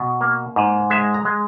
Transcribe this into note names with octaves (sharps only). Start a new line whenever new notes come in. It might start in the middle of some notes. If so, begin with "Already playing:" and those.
Already playing: B2
A#3
G#2
G#3 E5
A#5
G#3